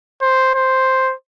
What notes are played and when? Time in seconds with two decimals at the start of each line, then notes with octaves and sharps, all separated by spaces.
0.21 C5
0.54 C5